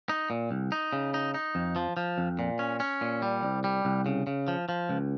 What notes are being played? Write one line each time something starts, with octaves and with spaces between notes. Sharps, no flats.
D#4
A#2
C2
D#4
C#3
D#4
D#4
F2
F3
F3
F2
A#2
C#4
C#4
A#2
G3
C2
G3
C2
C#3
C#3
F3
F3
C#2